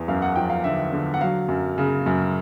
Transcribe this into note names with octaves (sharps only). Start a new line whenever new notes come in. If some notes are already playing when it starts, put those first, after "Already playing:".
Already playing: E2
F#2 F5
F#5
F3 G5
F5
D3 E5
D3
F#5
F#3 F5
F#2
C#3
F#2